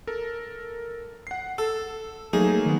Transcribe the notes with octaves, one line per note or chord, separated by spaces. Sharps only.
A4 A#4
F#5 C7
A4 E6
F#3 A3 A#3 D#4 G#4
D#3 B3 D#4